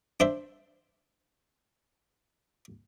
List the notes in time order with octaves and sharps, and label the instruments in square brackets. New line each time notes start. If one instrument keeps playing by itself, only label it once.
[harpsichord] D4 C5 E5